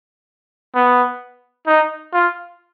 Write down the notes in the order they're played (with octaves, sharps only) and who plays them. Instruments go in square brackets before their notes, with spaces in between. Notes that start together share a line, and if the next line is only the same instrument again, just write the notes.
[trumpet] B3
D#4
F4